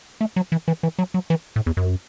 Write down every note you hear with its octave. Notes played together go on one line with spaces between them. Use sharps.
A3
F#3
E3
E3
E3
F#3
F#3
E3
A2
E2
F#2